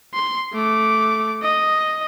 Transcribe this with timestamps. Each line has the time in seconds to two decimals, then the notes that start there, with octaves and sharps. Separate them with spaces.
0.14 C6
0.53 A3 D6
1.43 D#5